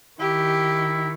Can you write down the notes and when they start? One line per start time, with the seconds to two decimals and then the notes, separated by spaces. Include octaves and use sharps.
0.20 D#3 E4 G4